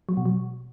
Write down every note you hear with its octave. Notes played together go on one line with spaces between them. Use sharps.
F#3
B2
F#3